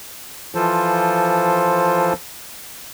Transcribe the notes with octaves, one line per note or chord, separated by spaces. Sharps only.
E3 F3 F4 A4 C5